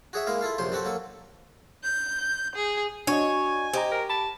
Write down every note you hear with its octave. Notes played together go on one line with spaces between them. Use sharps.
F#4 G#4 C#5 E5
G#3 A#3 E4 A#4 F5
E4 F4 A4 F5
A#1 F#2 C3 C5 C6
F#3 C4 F#4 G4 A4
F#3 A#3 A4
G6
G#4
D4 F#4 C#5 D#5 G#5
G4 C5 D#5 A#5
A#4
A5 B5